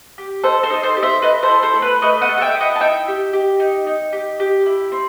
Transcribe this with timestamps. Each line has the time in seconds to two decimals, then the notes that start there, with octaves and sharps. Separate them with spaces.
0.18 G4
0.43 D#4 A4 C5
0.63 A4 C5
0.70 D#4 D#5
0.83 A4 C5
0.97 G4
1.03 C5 E5
1.22 A4 B4 D#5
1.43 A4 C5
1.50 E4
1.63 A4 C5
1.75 A3
1.82 B4
2.02 A3 B4 D#5
2.21 D#5 F#5
2.29 A4
2.38 F#5
2.41 E5 G5
2.55 E4
2.60 D#5 F#5
2.76 A5
2.81 D#4 E5 G5
3.08 G4
3.33 G4
3.60 D#4
3.87 D#4
4.13 G4
4.40 G4
4.66 E4
4.92 C4